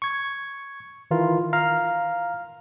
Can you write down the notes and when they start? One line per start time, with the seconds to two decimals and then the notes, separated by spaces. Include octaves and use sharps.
0.02 C#6 G#6
1.11 D#3 E3 E4 F4 A#4
1.53 F5 A#5 F6